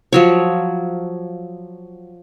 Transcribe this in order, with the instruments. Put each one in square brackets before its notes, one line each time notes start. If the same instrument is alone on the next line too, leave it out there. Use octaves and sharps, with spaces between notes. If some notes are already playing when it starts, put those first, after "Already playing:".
[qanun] F3 F#3 C#5